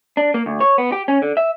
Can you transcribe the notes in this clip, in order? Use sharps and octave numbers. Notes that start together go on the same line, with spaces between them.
D4
A#3
D2
C#5
B3
G4
C#4
D3
E5